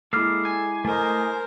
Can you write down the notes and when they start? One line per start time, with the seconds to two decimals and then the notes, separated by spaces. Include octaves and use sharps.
0.13 G#3 A#3 E4 A4 D6 F6 C7
0.45 G#5
0.85 A3 A#4 C5 D#5